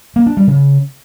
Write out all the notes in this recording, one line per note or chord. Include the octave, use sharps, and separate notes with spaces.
A#3
D4
G3
C#3